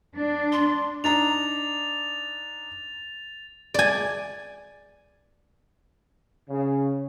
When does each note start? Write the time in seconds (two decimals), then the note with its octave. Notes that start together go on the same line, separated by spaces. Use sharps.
0.16 D4
0.52 C6
1.04 D4 D#4 A#5 A6 F7
3.74 D5 G#5
6.49 C#3